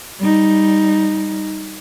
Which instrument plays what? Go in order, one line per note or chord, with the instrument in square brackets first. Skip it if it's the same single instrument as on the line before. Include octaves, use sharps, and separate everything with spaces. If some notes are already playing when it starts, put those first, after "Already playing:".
[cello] G3 D#4